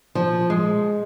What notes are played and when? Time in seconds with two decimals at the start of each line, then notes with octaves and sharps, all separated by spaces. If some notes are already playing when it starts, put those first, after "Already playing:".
0.15 F3
0.50 G#3